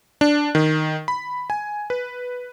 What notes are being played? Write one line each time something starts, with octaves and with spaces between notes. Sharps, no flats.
D4
D#3
B5
G#5
B4